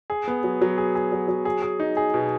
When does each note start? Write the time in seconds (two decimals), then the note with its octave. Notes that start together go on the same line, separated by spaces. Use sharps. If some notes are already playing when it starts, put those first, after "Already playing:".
0.10 G#4
0.28 B3
0.44 F#3
0.61 F#3
0.78 G#4
0.95 G#4
1.12 F#3
1.28 F#3
1.45 G#4
1.62 G#4
1.80 D#4
1.97 G#4
2.14 B2